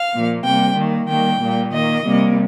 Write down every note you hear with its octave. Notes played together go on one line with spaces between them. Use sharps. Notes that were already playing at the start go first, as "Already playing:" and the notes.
Already playing: F5
A#2 F3 A#3
C3 G3 A#3 G5
D#3 A#3
D#3 G3 A#3 G5
A#2 G3 A#3
D#3 A#3 D#5
C3 G3 A#3